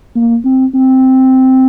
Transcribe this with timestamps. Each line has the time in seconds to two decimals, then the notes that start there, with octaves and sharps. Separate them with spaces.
0.16 A#3
0.44 C4
0.74 C4